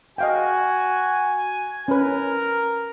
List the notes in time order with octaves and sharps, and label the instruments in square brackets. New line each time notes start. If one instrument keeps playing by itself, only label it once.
[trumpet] F#4 [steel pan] D#5 F5 G5 [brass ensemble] G#5
[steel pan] C#4 B4 [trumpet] A#4